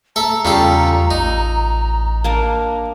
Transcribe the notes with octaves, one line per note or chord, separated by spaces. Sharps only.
A4 E5 A#5
E2 C#3 G3 F4 A4
A1 D#4
A#3 D4 A#4